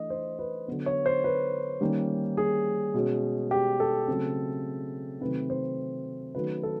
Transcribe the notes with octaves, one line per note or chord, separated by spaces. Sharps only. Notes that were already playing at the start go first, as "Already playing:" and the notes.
Already playing: E3 A3 D4 D#5
C5
B4
D3 F#3 B3
C#5
C5
B4
D#3 G3 A#3 C#4
G#4
B2 G#3 C#4
G4
A4
C#3 F#3 A3 C4
C3 D#3 F#3 A3 C4 B4
C5
D#3 F#3 A3 C#4 B4
A4